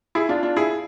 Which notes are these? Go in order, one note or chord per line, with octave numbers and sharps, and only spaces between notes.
E4 G#4
D4 F4
D4 F4
E4 G#4